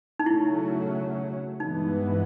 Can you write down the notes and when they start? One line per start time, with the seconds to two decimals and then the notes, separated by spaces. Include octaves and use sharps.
0.19 D#4
0.26 C#3 F#3 A3 C#4 E4
1.60 G2 E3 G#3 B3 D#4